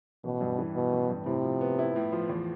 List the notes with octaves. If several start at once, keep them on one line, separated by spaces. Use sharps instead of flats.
A1 B2
G2
E3
B2 B3
A1
G2
A2 C3
F3
B3
E4
A2
F3
E2